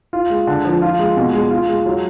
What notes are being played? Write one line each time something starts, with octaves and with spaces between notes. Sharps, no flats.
F4
G#3
D3
F3
F4
G#3
B2
G#3
F4
G#3
F#3